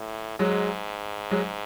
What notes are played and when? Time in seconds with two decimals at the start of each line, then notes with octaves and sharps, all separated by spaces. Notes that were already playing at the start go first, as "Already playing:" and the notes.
Already playing: A2
0.39 G#2 F#3 G#3
1.31 F#3 G#3